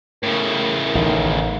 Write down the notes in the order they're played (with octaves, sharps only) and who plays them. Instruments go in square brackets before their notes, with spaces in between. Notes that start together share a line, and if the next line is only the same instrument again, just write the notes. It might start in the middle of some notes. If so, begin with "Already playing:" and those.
[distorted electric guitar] A2 C#3 [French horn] A#4
[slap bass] A1 [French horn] D#3